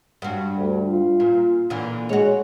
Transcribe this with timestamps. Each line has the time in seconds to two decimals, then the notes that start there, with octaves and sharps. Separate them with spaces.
0.22 G2 F#4
0.57 D2
0.88 F4
1.20 A#2
1.70 A#2 D3 E3
2.09 G#3 F#4 C#5